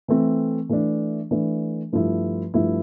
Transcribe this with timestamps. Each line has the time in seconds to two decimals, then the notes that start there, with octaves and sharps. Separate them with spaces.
0.08 E3 A3 C4
0.69 E3 A3 D4
1.31 E3 A3 D4
1.92 G2 F3 A3 E4
2.54 G2 F3 A3 E4